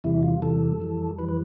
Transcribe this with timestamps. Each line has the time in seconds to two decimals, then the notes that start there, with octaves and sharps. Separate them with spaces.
0.04 E2 C3 E3 G3 E4
0.23 F4
0.42 E2 C3 E3 G3 A4
0.80 F2 E3 G3
1.18 F2 E3 G3 B4
1.29 B4